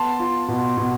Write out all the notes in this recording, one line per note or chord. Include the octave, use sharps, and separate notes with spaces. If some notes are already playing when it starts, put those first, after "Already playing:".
Already playing: B3 A5 C6
F4
B2
B2